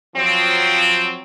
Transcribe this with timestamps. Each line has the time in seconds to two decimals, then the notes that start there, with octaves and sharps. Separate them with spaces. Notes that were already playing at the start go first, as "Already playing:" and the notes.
0.15 F3 F#3 C4